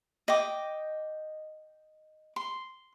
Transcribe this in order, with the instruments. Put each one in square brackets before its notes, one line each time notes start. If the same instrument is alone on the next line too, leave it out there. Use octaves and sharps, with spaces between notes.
[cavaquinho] D#5 G5 D6
C6